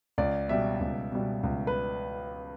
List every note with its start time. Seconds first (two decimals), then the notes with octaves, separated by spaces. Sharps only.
0.18 C#2 D5
0.49 B2 G3 E5
0.81 C#2
1.12 B2 G3
1.44 C#2
1.67 B4